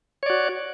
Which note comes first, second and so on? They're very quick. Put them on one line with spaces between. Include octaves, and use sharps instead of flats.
C#5 D5 F#4